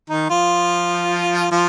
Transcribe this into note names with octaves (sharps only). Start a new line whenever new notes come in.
D#3 D#4
F3 F4
F3 F4